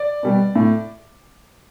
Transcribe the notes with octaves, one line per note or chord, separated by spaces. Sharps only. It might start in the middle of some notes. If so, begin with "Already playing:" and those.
Already playing: D5
B2 G3 B3
A2